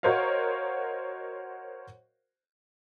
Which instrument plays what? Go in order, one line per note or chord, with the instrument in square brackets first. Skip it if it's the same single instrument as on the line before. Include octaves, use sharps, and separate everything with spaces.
[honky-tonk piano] F#4 A#4 C5 C#5 D#5 F5